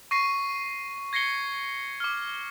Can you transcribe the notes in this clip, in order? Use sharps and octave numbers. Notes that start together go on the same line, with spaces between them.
C#6 A#6 C7 D#7
G#6 A#6 C7 C#7 G7
D6 F6